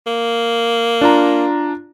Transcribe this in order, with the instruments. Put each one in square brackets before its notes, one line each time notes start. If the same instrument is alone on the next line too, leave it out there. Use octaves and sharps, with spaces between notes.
[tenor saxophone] A#3
[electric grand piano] D4 F4 A#5